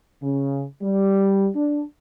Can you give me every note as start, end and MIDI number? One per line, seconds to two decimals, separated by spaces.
0.22 0.63 49
0.83 1.48 55
1.55 1.81 62